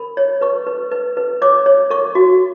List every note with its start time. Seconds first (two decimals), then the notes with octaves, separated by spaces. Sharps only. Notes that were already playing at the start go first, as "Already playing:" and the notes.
Already playing: A#4 B5
0.17 C#5
0.41 B4 C#6
0.66 B4
0.91 B4
1.17 B4
1.42 C#5 D6
1.66 C#5
1.90 A#4 C#6
2.15 F#4